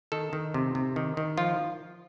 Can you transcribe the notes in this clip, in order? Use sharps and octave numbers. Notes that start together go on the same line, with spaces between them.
D#3 A4
D#3
C3
C3
D#3
D#3
F3 F4